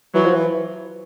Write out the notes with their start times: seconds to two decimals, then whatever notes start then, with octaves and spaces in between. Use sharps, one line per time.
0.14 E3 F#3
0.25 F3
0.34 E3